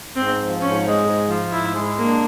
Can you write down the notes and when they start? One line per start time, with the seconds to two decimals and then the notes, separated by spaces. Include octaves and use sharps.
0.16 G#2 C4
0.39 F3
0.61 G#2 C#4
0.84 G#3
1.06 G#2
1.29 F3
1.52 G#2 E4
1.74 G#3
1.97 A#3 D4